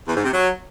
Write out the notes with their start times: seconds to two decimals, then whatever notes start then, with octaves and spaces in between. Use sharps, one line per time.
0.07 E2
0.15 G#2
0.23 C3
0.32 F#3